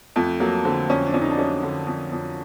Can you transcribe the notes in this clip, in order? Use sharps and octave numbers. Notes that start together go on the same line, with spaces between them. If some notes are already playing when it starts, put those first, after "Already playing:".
F2 A3
F#3 A#3
D3 C4
F2 C#4
D4
F2 C#4
D#4
D4
F#3 C#4
D3
F2
F2